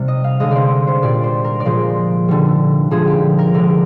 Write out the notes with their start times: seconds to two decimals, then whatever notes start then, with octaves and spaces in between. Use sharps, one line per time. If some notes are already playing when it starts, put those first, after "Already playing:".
Already playing: C3 G3
0.08 D#5
0.24 F5
0.40 D3 G#3 D#5
0.51 C5 D5
0.87 C5
1.02 A#2 G3 D5
1.23 C5
1.44 A#4
1.60 D5
1.65 A#2 F3 G#3 C5
2.28 D3 G3
2.91 D3 F3 G#3 G#4
3.07 G4
3.38 A#4
3.54 D3 G#3 D5